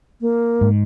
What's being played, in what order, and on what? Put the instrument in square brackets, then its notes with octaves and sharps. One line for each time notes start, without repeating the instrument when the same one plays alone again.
[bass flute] A#3
[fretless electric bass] G#2